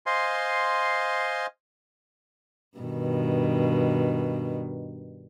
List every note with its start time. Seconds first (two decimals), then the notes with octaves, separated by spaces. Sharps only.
0.06 C5 D#5 F5 G#5 C6
2.78 G2 B2 D#3